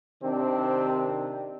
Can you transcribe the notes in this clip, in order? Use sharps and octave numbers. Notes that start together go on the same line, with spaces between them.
C3 D#3 C4 D4